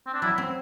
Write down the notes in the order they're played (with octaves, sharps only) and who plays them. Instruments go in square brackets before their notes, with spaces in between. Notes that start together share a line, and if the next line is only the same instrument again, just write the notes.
[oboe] C4
D4
[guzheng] F#3 [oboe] E4
[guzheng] C4